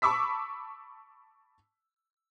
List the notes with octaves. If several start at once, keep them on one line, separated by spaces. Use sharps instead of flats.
A5 B5 C#6 D6 E6 B6